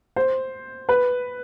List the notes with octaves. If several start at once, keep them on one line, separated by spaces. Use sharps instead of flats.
C5
B4